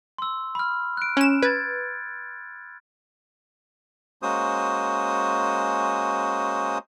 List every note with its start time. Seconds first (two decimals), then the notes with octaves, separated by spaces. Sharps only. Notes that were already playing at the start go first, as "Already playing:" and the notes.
0.18 C6 E6
0.55 B5 F6
0.97 F#6 D7
1.17 C#4 E7
1.43 B4 G#6 A6
4.22 G#3 A#3 C#4 F#4 C5 D#6